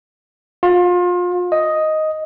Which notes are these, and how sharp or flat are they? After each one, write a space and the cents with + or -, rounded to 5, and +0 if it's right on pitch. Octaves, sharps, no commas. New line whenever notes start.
F4 +30
D#5 +5